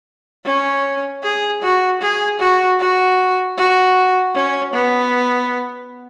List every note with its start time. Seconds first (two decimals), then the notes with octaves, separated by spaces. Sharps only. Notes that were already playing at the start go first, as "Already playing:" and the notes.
0.45 C#4
1.23 G#4
1.62 F#4
2.01 G#4
2.40 F#4
2.80 F#4
3.57 F#4
4.35 C#4
4.74 B3